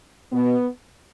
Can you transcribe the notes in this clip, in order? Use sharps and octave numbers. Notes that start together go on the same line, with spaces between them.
B2 B3